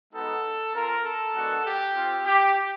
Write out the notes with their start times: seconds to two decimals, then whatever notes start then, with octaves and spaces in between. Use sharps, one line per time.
0.13 G#3 B3 D#4 F#4 A4
0.74 C4 F4 A#4
1.04 A4
1.34 G#3 B3 D4 F#4
1.64 G4
1.94 C4 F4
2.24 G4